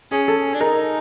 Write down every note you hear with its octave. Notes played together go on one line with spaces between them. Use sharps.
C#4 G#4
A4
D4
D#4 A#4